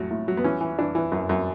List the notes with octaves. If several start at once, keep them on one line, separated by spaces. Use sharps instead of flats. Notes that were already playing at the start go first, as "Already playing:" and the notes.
Already playing: A2 F#3
A2
F#3
B3
E3 C#4
E3
E3 D4
E3
F#2
F#2